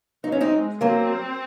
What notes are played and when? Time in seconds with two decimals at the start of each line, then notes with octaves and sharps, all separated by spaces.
0.24 F#3 D#4
0.32 C#4
0.41 C4 D#4
0.53 G#3
0.81 F#3 A#3 C4